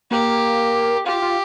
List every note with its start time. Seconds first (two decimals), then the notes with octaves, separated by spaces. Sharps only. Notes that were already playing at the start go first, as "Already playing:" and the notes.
0.11 A#3 G4
1.06 F4 G4
1.22 F4